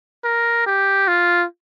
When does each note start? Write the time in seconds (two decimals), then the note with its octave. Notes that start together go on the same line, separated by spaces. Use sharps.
0.25 A#4
0.67 G4
1.08 F4